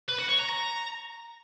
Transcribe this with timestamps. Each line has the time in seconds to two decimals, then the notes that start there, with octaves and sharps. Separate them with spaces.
0.09 B4
0.19 F#4
0.29 C#5
0.39 A#5
0.49 A#5